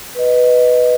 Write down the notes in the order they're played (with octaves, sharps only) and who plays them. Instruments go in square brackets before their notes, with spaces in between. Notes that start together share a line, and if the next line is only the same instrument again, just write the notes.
[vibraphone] B4 D#5